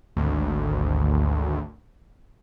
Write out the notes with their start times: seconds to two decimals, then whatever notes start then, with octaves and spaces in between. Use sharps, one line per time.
0.17 G#1 D2